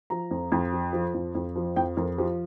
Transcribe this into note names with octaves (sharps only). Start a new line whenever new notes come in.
F3 A#5
F2
F2
F3
F3
F2
F2
F3
F2 G5
F2 A#4
F3 G4